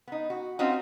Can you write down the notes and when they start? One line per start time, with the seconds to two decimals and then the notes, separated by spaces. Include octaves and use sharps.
0.07 B3 D#4
0.30 F#4
0.59 C4 C#4 D#4 F4 F#4